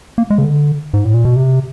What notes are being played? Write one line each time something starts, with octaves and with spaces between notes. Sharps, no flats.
A#3
G#3
C#3
D3
G#2
A2
A#2
B2
C3